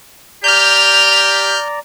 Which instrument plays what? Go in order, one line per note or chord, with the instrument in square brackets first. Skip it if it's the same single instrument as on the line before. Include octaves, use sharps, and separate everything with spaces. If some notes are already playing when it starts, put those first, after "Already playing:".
[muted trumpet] G4 [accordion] D5 A#5 [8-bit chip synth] F6 G6 [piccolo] F7